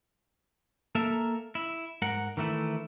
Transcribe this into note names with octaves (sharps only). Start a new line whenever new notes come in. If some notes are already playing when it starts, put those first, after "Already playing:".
A#3 A4 A#4 E5
E4
G#2 A#4 F#5
D#3 E3 A3 E4